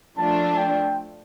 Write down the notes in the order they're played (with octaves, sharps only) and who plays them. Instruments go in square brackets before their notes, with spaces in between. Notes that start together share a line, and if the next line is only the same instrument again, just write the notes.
[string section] F3 A3 D4 F4 [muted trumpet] A5
[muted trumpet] G5